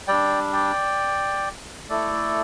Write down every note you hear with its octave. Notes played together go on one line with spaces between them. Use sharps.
G3 D4 D5 G5
D5 G5
A3 E4 A4 D5